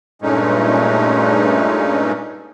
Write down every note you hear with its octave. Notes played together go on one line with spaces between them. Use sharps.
G2 A#2 G#3 A3 C#4 D#4